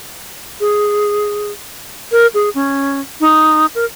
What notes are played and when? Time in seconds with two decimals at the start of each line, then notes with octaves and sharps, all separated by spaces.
0.60 G#4
2.12 A#4
2.34 G#4
2.55 C#4
3.20 D#4
3.75 A#4